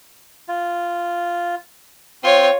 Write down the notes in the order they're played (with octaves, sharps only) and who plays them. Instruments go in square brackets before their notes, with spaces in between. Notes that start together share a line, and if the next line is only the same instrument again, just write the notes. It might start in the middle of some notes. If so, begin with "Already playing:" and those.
[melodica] F4
[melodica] C4 [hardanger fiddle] F4 C#5